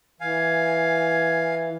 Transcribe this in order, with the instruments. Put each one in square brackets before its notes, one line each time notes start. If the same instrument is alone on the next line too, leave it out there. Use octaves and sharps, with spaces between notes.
[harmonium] E3 [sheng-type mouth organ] F5 G#5